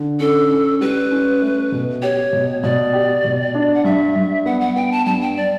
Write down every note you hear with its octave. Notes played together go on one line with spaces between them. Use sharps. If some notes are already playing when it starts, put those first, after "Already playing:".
Already playing: D3
C#4 A4
C#4
G3 B4
C#4
A3
B2
G4 C#5
B2
B2 D5
G4
B2
D4
F#5
G2 E5
G2
B3 F#5
F#5
B3 G5
A5
G2 A5
G5
D5